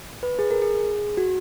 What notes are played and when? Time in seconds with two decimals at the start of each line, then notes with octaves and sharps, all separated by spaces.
0.23 B4
0.39 G#4
0.51 A#4
0.62 G#4
1.17 F#4